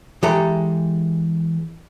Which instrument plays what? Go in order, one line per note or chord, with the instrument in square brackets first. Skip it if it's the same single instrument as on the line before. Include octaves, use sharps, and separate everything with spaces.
[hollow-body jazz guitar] E3 G#3 G4 A4 A#5